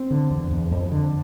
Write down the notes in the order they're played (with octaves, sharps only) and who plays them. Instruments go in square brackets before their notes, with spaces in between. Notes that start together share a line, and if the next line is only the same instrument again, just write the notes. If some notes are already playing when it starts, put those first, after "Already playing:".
Already playing: [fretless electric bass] C4
D3
E2
E2
F2
D3